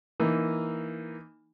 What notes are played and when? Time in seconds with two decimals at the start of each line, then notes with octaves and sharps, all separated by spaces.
0.20 E3 A#3 D#4